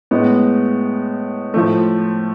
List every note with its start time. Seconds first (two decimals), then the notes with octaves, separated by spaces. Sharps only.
0.11 A2 G#3 B3
1.54 A2 F3 A3